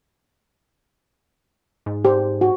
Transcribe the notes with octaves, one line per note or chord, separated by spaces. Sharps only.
G#2
G4 C5
F#4